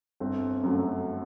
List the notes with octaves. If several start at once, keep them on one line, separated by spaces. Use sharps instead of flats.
G1 C4
F#2 F#3 A3